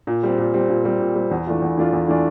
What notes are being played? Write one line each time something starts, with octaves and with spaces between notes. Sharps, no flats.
A#2
G3 C4
A#2
G3 C4
A#2
G3 C4
A#2
G3 C4
E2
E3 A3 D4 F4
E2
E3 A3 D4 F4
E2
E3 A3 D4 F4